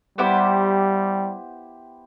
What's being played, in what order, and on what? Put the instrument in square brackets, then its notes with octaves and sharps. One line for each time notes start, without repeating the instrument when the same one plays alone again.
[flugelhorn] G3 [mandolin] B3 E4 G4 C5